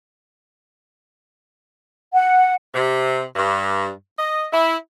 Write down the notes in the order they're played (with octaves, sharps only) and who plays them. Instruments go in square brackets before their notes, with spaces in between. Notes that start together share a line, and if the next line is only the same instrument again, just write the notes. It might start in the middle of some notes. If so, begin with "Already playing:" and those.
[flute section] F#5
[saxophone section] C3
G2
D#5
E4